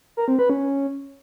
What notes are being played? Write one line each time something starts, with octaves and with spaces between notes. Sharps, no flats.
A#4
C4
B4
C#4